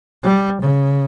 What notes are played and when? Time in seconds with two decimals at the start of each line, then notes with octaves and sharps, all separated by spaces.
0.23 G3
0.61 C#3